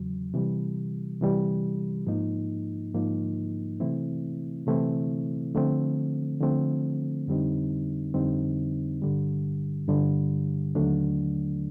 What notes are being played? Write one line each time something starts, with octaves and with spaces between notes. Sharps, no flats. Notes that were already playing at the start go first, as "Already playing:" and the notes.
Already playing: E2 C#3 F#3
C3 E3 G3
C3 E3 G3
G#2 F3 A#3 D#4
G#2 F3 A#3 D#4
C3 E3 A3 C4 E4
C3 E3 A3 C4 E4
D3 F3 A3 C4
D3 F3 A3 C4
F2 D3 G3 C4 D#4
F2 D3 G3 C4 D#4
G2 D3 G3
G2 D3 G3
D#2 D3 F#3 A3 D4